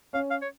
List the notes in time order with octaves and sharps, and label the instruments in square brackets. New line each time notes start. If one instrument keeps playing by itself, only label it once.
[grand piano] C#4 [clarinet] F5
[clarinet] F5
C#5